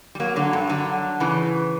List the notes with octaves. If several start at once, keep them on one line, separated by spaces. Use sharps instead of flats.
G3
F#3 A#3
D3 F#3
G2
D3 F#3
C#3 E3